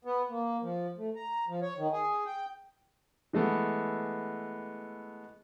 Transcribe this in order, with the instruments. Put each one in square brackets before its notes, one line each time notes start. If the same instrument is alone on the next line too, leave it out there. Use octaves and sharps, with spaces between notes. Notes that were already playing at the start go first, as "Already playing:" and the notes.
[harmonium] B3
A#3
F3
A3
A#5
F3
C#5
D#3
G#4
G5
[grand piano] E3 G#3 A3 B3